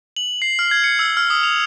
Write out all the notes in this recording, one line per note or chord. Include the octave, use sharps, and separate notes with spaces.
F#7
C7
F6
G#6
C#7
E6
F6
D#6
F7